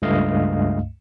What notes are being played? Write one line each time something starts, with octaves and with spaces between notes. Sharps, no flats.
C#2 G2 A3 D#5 F5